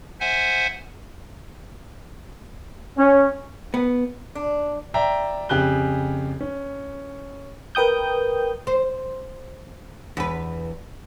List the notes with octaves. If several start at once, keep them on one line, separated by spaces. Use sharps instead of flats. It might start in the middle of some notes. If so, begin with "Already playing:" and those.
C5 E5 F#5 G#5
C#4
B3
D4
D5 E5 G5 A#5
F2 C#3 G4 G#5 F#6 G7
C#4
A#4 B4 G5 D#6 G6
C5
E2 B4